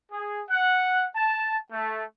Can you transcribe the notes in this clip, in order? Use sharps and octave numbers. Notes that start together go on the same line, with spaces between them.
G#4
F#5
A5
A3